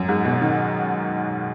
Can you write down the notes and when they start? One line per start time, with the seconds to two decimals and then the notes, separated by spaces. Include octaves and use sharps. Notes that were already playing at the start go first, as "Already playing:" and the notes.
Already playing: F#2
0.09 G#2
0.25 B2
0.41 D#3